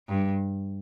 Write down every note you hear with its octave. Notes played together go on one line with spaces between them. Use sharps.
G2